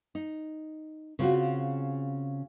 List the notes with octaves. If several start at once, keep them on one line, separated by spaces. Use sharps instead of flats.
D#4
C#3 C4 F4 F#4